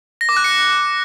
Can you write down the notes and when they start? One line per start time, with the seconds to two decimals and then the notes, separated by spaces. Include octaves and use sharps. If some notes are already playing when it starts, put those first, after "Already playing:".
0.21 A#6
0.29 D6
0.37 F#6
0.44 C#7